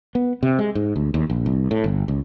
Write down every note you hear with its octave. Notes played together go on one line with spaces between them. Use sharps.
B3
C3
G#3
G#2
D2
D#2
A#1
C2
A2
G1
C#2